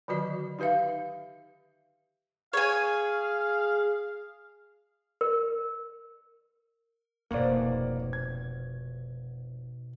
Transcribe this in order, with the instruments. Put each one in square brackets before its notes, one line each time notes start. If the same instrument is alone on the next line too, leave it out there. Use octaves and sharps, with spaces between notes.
[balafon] D3 D#3 F#3 F#4 D5 D#5
D#4 G4 B4 E5 F5
[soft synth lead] G#4 [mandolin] C#5 G#5 [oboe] F5
[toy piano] A#4
[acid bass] F1 [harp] G#2 B2 F#4 [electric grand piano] A#3 D5
[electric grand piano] G#6